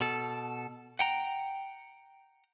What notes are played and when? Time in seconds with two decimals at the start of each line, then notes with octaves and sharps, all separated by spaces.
0.01 B2 A4
0.99 F#5 G5 A#5